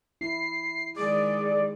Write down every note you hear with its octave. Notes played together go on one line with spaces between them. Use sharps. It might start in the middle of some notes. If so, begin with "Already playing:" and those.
E4 C7
D#3 G#3 G#4 D5